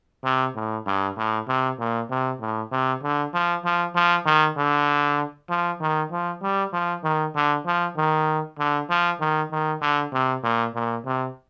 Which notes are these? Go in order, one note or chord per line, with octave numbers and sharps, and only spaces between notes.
C3
A2
G2
A2
C3
A#2
C3
A2
C3
D3
F3
F3
F3
D#3
D3
F3
D#3
F3
G3
F3
D#3
D3
F3
D#3
D3
F3
D#3
D#3
D3
C3
A#2
A#2
C3